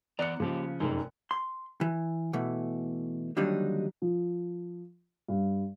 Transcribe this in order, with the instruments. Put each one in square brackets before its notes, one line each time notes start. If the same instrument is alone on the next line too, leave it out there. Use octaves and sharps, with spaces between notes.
[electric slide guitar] E3 B3 A#5 [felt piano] D5 F#6 C#7
[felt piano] C#3 F3 [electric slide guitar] A#3 G4
[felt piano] F1 F#2 [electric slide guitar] D#4 G#4
[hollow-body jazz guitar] C6
E3
B2 E3 A3
D#2 D3 F#3 G3 D4 D#4
[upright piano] F3
G2